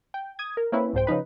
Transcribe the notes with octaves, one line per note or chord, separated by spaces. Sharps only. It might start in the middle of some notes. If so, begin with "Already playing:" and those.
G5
D#6 G#6
A#4
A#3 C4 C#4 E4 B4
C2 G#2 C5 G5
C#3 F3 D#4 B4